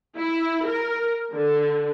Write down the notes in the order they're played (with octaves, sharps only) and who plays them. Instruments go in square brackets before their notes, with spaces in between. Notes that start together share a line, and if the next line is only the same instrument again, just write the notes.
[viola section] E4
A#4
D3